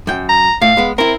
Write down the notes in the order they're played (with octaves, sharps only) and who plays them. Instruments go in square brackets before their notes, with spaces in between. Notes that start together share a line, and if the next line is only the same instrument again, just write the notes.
[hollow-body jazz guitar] F#2 G5
[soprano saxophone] A#5
[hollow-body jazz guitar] A2 [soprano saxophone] F5
[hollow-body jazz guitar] G#3 B3
[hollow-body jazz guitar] C4 E4 [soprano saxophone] A#4